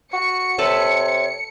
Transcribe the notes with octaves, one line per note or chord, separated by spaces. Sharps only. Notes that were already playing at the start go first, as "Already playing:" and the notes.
F#4 C#7
C3 A4 B4 C#5 A5